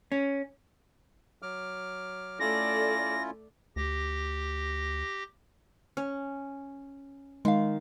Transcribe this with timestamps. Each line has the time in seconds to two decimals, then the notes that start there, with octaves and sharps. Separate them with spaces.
0.12 C#4
1.42 F#3 D6 F6
2.40 A3 C#4 E4 F4 A4 D5 A#6
3.76 D2 G4 A#6
5.97 C#4
7.45 D#3 G#3 F5